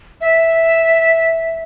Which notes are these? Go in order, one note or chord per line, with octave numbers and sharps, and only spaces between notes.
E5